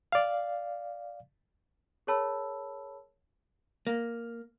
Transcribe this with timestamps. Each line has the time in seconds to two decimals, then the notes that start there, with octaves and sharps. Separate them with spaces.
0.12 D5 F5
2.07 G#4 A#4 C#5 A5 B5 E6
3.87 A#3